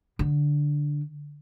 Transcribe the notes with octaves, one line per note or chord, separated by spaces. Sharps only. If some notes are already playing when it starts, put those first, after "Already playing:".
D3